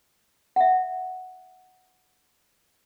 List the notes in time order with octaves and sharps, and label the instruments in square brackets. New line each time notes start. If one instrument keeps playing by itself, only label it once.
[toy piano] E5 F#5